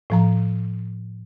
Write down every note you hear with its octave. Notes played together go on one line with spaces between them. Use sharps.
A2 F3 A#5